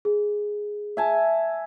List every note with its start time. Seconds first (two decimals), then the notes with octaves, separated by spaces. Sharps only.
0.05 G#4
0.97 E5 G#5 A5